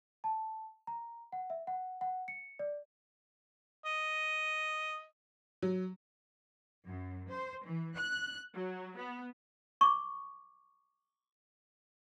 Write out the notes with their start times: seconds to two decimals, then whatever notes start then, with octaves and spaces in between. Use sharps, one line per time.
0.24 A5
0.87 A#5
1.32 F#5
1.50 E5
1.67 F#5
2.01 F#5
2.28 C#7
2.59 D5
3.85 D#5
5.62 F#3
6.86 F#2
7.29 C5
7.65 E3
7.96 F#6
8.54 F#3
8.98 B3
9.81 C#6 D6